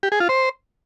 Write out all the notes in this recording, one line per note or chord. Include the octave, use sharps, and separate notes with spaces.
G4
G#4
F4
C5